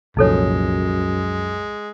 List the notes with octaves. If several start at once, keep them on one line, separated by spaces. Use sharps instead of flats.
C2 F#2 A#2 F3 G#3 D#4 A4 C#5